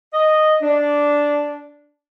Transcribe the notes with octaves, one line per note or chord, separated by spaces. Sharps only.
D#5
D4